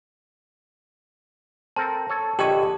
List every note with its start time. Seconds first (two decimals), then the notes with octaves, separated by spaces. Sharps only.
1.76 C4 A4 A#4 A5
2.10 A4 C#5
2.39 A#1 D3 G4 D#5 G#5 C#6